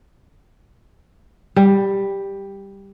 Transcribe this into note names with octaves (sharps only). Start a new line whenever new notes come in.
G3